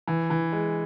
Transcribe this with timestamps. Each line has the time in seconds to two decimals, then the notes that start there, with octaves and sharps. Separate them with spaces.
0.07 E3
0.30 E3
0.53 G#3